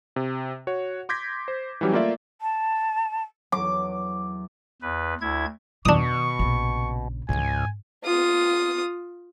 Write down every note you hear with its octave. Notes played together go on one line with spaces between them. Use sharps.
C3
F#4 C#5 F#5
C6 D6 G6 G#6 A#6 B6
C5
E3 F#3 G3 C#4 G4
A3 A#3 F4 D5 E5
A5
E2 F#3 D6
E2 B4
D2 E4 G#6
B2 D#3 D4 C#6 D#6
A#1 C#3
C#2 G#2 G#5
F4 D#6